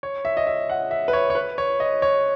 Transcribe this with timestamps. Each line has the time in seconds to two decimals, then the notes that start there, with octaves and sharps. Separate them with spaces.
0.03 C#5
0.25 E5
0.37 D#5
0.47 E5
0.70 F#5
0.91 E5
1.08 B4
1.13 C#5
1.30 C#5
1.35 B4
1.58 C#5
1.80 D#5
2.02 C#5